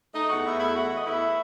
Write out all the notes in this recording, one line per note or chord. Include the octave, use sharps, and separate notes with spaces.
A3 D#4 D#5
E2 F#4 F#5
E2 E4 E5
A3 E4 E5
A3 F#4 F#5
A3
D#5
E2 E4 E5